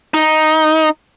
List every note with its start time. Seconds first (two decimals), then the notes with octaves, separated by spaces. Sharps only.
0.14 D#4